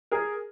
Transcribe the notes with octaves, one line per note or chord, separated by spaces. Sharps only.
G#4 A#4